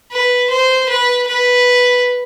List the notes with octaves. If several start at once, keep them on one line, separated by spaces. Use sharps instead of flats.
B4
C5
B4
B4